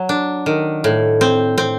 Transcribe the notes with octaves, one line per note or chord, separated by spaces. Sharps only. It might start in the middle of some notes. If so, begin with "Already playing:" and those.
Already playing: F#3
D4
D#3
A2
C4
C4